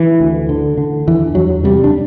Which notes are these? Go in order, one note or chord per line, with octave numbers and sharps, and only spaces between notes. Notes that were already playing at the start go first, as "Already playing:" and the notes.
Already playing: E3
D2
D3
D3
E2 E3
E2 F#3
C3 G3
D4